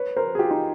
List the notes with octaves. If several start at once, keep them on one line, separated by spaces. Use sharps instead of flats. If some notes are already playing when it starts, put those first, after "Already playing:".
Already playing: B4 C#5
A#4 C5
G#4
F4 G4
D#4 F4